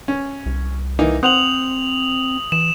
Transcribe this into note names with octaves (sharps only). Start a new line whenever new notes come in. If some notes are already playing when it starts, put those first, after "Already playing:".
C#4
C2
E3 A#3 D#4
C4 C5 F#5 D#6 F7 F#7
E3 E7